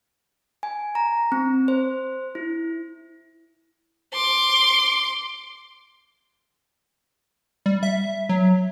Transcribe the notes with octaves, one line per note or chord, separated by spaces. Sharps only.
G#5
A#5
C4
C5
E4
C6 D6
G3
E5
F#3